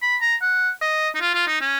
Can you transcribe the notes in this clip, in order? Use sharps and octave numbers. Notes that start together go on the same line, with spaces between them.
B5
A#5
F#5
D#5
D#4
F4
F4
D#4
C#4